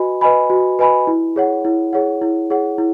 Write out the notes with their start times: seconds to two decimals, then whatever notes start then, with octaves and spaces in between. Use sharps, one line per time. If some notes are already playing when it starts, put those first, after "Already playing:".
Already playing: F#4 B4 D#5 G#5 B5
0.21 B4 D#5 G#5 B5
0.50 F#4
0.79 B4 D#5 G#5 B5
1.07 E4
1.36 G#4 C#5 F#5
1.65 E4
1.93 G#4 C#5 F#5
2.21 E4
2.50 G#4 C#5 F#5
2.78 E4